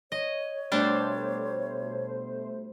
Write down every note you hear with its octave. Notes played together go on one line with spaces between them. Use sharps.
C#5 D#5
B2 G3 A3 D4 C5